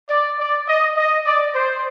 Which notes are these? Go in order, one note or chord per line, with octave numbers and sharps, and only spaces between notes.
D5
D5
D#5
D#5
D5
C5